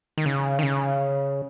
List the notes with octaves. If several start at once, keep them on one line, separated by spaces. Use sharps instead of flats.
D#3
C#3
D#3
C#3